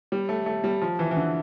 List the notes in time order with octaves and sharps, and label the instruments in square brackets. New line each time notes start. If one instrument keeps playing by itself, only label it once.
[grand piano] G3
A3
A3
G3
F3
E3
E3
D3